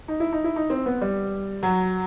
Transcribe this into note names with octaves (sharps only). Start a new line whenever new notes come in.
D#4
E4
D#4
E4
D#4
C4
B3
G3
F#3